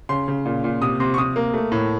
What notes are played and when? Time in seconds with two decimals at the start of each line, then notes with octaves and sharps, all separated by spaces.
0.09 C#3 C6
0.28 C#3
0.46 A#2
0.64 A#2
0.81 C3 D#6
1.00 C3 C6
1.14 C#6
1.18 C3 D#6
1.36 A#3
1.54 A3
1.72 A2